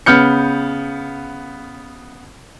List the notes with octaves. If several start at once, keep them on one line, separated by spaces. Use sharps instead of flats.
C#3 B3 F6 G6 C#7